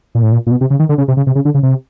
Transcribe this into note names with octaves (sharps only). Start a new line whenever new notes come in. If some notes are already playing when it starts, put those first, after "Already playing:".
A#2
A2
A#2
A#2
B2
C3
C#3
D#3
D3
C#3
C3
C#3
C3
C#3
D3
C#3
C3